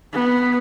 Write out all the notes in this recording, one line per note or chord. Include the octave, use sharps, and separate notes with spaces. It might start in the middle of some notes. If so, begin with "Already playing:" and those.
B3